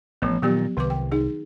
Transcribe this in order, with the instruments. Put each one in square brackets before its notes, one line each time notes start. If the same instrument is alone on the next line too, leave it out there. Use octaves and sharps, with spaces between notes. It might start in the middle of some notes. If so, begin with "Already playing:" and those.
[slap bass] A1 [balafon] F3 B3
[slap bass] A#2 D#3 [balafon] F#3 B3 G4
[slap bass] C2 [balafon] D#3 B4 D6
[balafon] G5
D#4 G#4